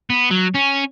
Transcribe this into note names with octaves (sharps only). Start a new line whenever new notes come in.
B3
F#3
C#4